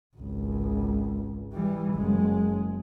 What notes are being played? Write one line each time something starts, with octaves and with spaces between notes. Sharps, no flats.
G#1 C#2
E3 G3
F#1 G#3